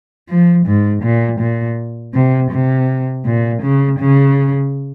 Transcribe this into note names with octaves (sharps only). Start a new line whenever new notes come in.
F3
G#2
A#2
A#2
C3
C3
A#2
C#3
C#3